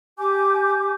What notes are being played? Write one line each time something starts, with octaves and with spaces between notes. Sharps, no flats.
G4 G#5 D6 G6